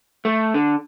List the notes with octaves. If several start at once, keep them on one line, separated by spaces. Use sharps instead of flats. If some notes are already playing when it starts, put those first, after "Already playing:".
A3
D3